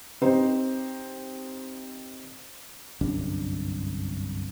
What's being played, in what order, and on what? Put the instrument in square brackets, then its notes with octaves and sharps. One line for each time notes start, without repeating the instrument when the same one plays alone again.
[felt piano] C4 D#4 G4 C5
[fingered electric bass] G1 C2 F#2 D4